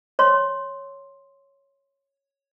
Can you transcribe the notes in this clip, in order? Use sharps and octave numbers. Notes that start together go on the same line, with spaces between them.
C#5 C6